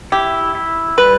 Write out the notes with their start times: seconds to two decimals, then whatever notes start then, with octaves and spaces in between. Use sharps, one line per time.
0.12 E4 G4
0.55 E4
0.98 G3 B4